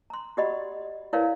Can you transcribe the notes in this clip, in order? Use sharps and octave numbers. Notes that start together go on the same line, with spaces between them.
A#5 C6
F#4 G4 D5 D#5 F#5 B5
E4 A#4 B4 C#5 D5 F5